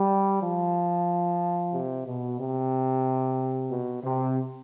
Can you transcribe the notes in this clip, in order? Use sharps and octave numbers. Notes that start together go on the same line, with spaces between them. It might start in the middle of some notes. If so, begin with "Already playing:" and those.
Already playing: G3
F3
C3
B2
C3
B2
C3